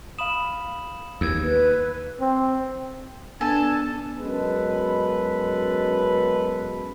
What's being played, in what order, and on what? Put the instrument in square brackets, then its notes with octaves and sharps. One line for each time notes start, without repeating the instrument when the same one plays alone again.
[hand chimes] F5 B5 D#6 [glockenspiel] E7 F#7
[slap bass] D#2 [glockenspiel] E6 G#6
[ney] B4
[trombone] C4
[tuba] B3 [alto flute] D4 [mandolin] A4 G#5 [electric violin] A5
[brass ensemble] F#2 B2 G#3 A4 B4